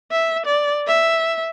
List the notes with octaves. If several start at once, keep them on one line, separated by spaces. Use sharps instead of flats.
E5
D5
E5